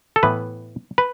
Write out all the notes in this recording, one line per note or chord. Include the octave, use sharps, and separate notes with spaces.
A4
A2 E3 B3 B4
B4